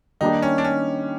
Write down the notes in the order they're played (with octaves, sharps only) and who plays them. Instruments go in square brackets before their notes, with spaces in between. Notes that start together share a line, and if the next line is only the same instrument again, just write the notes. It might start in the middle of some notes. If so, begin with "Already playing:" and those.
[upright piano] D#3 G3 A#3 D4 G4 [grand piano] D#4
[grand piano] C#4
D4
C#4